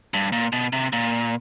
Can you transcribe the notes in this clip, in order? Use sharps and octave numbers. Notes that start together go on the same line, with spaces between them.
G2
A#2
B2
C3
A#2